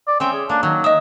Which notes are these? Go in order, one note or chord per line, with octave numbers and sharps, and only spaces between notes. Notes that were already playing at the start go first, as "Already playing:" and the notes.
D5
C4 C#4 E5 G5
G#4
A#3 D4
D#3 F#3
D#5 E5 D#6